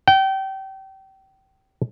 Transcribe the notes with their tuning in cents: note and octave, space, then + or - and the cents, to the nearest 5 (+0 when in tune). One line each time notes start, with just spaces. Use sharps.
G5 -30